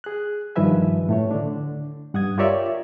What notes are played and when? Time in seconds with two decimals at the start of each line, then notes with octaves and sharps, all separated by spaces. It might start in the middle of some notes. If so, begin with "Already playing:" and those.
0.04 G#4 F#6
0.56 G2 D#3 F3 B4 E5 G#5
1.09 A2 A3 C#5
1.31 D3 D4
2.14 G2 F#5 D#6 G#6
2.38 F4 G4 A#4 C#5 D5 E5